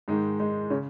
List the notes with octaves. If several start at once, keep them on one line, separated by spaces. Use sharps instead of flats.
G#2 D#3 G#3
G#3
C#3 C#4